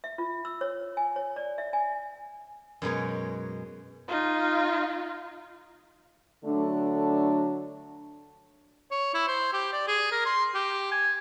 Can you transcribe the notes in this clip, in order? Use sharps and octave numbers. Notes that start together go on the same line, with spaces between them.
E5
F4
E6
C#5
G#5
C#5
D5
E5
G#5
F#2 B2 G#3 C#5
D#4 F4
D3 F#3 A3 D4
C#5
E4
C5
G4
D5
G#4
A#4
C6
G4
G#5